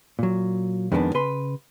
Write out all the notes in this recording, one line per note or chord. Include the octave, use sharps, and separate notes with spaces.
A#2 F#3
F2 D#3 G#3 B3 C4 D4
C#3 B4 C6